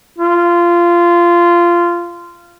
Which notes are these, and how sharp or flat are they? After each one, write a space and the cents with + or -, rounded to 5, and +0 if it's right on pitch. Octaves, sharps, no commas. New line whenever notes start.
F4 -15